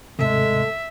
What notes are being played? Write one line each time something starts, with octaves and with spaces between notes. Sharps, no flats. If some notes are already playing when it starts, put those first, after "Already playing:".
D#2 G#2 C3 G#3 A3 A4 E5